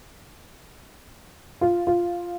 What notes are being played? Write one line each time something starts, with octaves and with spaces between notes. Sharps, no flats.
F4
F4